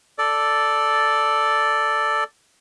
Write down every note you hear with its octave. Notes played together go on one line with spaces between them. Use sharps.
A4 D5